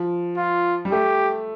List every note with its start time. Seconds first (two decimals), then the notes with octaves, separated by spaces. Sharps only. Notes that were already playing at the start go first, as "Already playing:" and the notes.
Already playing: F3
0.37 F4
0.85 G3
0.92 A3 G4